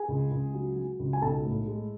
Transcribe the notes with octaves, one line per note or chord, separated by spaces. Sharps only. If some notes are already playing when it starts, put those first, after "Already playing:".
Already playing: G#4 G#5
C#2
C#2
F#3
F#3
C#2
G#5
B1 A4 A5
A2
G#3